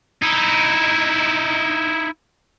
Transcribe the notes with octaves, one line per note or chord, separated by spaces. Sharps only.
D#4 E4